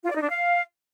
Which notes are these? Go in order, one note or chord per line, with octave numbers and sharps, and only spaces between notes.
F4
D5
D#4
D4
F5